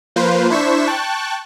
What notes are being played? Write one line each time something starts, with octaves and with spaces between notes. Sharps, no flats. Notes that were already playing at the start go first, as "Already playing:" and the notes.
F3 A#3 F4 B4 C5
D4 E4 C5 C#6 B6 E7
G5 A5 C#6 F#6